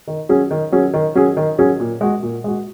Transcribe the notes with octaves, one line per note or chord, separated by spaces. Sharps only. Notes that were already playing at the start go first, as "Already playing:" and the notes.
D#3
F#3 C#4 G#4
D#3
F#3 C#4 G#4
D#3
F#3 C#4 G#4
D#3
F#3 C#4 G#4
A#2
G#3 F#4
A#2
G#3 F#4